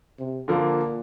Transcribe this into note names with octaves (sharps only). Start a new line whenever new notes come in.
C3
A#2 D3 F3 A#3